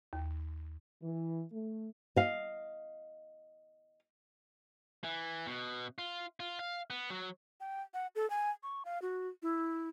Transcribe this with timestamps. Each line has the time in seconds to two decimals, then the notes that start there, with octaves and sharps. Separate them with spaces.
0.13 D#2
1.02 E3
1.52 A3
2.16 D#5 F5
5.04 E3
5.47 B2
5.98 F4
6.40 F4
6.59 F5
6.90 B3
7.10 F#3
7.60 G5
7.94 F#5
8.15 A4
8.30 G#5
8.63 C#6
8.85 F5
9.02 F#4
9.42 E4